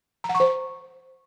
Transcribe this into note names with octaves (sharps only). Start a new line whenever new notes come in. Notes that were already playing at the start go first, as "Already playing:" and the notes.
A#5
F#5
C#6
C5